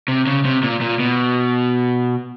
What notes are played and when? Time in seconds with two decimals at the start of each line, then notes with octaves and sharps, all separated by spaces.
0.08 C3
0.27 C#3
0.45 C3
0.63 A#2
0.81 A#2
0.99 B2